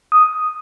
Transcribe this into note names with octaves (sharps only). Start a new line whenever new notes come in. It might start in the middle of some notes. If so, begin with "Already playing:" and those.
D#6